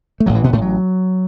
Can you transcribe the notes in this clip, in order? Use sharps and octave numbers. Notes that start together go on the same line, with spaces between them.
A3
A1 A2 F#3
E3
B2 B3
A2 A3
F#3